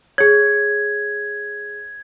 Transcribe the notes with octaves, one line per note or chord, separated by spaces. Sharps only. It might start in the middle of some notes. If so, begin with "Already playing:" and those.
G#4 C#5 G#6